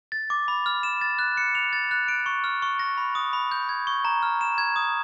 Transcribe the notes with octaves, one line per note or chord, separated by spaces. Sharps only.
A6
D6
B5
F6
E7
A6
F#6
C#7
F7
A6
F#6
D7
C#6
F6
C#6
A#6
B5
D#6
B5
G6
G#6
C#6
A#5
F6
E7
G#6
D#6